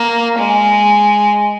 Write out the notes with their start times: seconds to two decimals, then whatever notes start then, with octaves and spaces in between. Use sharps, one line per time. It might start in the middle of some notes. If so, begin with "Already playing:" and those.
Already playing: A#3
0.38 G#3